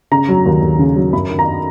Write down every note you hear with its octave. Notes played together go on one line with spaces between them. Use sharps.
C#3 A#5
F#3
D#2
D#2
C#3
F#3
F#2 B5
D#3
A#5